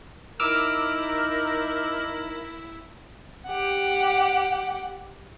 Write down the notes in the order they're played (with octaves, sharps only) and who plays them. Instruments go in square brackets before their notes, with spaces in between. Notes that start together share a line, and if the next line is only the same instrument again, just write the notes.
[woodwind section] D#4 A#4 [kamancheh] E4 [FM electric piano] D6 E6 F6
[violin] G4 F#5